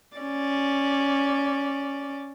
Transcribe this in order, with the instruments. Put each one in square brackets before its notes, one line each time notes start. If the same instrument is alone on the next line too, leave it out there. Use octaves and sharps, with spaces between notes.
[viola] C#4 D5